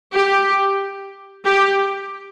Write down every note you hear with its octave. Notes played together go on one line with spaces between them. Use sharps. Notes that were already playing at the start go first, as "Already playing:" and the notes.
G4
G4